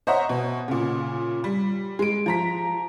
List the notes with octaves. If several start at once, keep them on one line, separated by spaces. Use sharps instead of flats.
C5 C#5 D#5 E5 F#5 A#5
B2
A#2 C#3
G3
G#3 D7
F3 A#5 B6